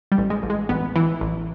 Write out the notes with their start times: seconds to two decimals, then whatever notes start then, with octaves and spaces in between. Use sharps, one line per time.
0.12 G3
0.18 A1
0.30 G#3
0.43 A1
0.50 G#3
0.69 A1 B3
0.96 E3
1.21 A1